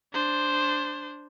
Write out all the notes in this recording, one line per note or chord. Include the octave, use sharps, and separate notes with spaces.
D4 C5